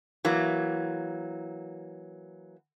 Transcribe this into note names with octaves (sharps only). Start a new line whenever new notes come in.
E3 F#3 A#3